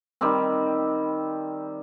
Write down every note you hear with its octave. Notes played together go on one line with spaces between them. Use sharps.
D#3 G3 C4